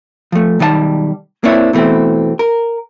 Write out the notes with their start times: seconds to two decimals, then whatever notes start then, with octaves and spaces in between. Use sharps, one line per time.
0.32 F3 A3
0.59 B1 D#3 G3 D5 A5
1.44 A#3 C4 D4 E4 C#5
1.73 B2 E3 A3 C4
2.39 A#4